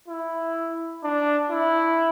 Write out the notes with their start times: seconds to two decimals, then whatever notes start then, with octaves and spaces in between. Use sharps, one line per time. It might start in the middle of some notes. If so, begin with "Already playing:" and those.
0.08 E4
1.04 D4
1.50 E4